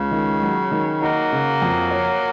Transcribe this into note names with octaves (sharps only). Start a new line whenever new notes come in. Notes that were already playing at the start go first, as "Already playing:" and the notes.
Already playing: C#2 C#3
D#3
F#3
D#3
F#3 A#3 D#4
C#3
F2
C#5